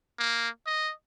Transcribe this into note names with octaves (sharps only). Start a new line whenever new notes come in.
A#3
D#5